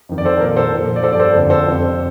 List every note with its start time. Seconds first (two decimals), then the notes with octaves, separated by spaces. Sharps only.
0.09 F2 D#3
0.18 D5
0.25 A4 C5
0.40 A#2 F3 A#4 D5
0.56 A4 C5
0.72 A#2 F3
0.96 D5
1.03 F3 A4 C5
1.08 G2 D5
1.20 A4 C5
1.35 F2 D3 F3
1.50 A4 C5
1.67 F2 C3 F3